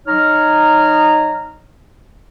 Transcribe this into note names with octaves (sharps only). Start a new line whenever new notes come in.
F#3 D#4 C#5 D#5 A#5 F6